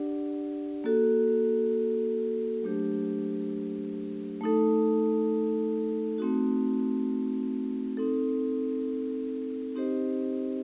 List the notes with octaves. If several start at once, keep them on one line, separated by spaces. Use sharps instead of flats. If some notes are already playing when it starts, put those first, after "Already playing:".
Already playing: D4 G4 D5 F#5
A#3 F#4 A4
F#3 A3 D4 G4 C5
A3 D#4 A4
A3 C4 D#4 F#4
C4 D#4 A4
C4 D#4 G4 C5 D#5